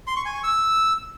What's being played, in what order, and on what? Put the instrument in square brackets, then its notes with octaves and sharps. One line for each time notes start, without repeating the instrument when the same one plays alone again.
[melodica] C6
C#6
G#5
C#6
E6